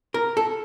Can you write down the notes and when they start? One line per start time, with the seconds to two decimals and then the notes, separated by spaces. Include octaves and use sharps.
0.14 A#4
0.37 A4